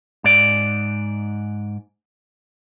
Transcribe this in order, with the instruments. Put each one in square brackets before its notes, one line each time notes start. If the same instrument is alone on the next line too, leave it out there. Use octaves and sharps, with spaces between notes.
[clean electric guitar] G#2 D5